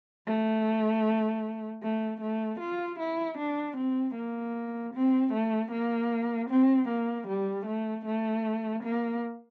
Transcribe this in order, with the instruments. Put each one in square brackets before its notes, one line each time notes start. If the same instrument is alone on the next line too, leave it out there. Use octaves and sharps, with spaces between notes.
[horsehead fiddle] A3
A3
A3
F4
E4
D4
C4
A#3
C4
A3
A#3
C4
A#3
G3
A3
A3
A#3